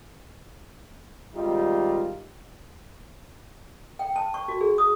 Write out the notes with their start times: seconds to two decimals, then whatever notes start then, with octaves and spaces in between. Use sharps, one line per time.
1.35 G#1 G3 D#4 F4
3.99 G5
4.16 A5
4.34 C#6
4.48 F#4
4.61 G#4
4.78 D#6